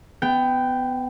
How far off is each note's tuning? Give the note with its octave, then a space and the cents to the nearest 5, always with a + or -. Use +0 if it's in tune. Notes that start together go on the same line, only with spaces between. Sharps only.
B3 +25 G5 +0